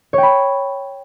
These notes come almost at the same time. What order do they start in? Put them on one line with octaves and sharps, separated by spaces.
C#5 G5 B5